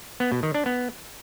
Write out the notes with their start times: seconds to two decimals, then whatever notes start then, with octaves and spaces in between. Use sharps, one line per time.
0.20 B3
0.32 B2
0.43 D#3
0.54 D4
0.66 B3